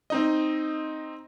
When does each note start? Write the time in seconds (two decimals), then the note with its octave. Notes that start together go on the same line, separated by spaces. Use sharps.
0.10 C4 D#4 D#5